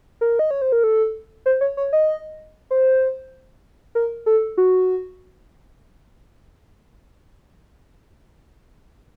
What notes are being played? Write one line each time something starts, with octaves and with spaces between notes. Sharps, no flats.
A#4
D#5
C#5
C5
A#4
A4
C5
C#5
C#5
D#5
C5
A#4
A4
F#4